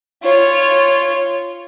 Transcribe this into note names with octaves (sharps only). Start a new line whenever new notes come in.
F4 C#5